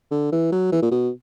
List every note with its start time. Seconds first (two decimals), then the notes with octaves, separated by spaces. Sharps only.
0.11 D3
0.32 E3
0.52 F#3
0.72 E3
0.82 A#2
0.91 B2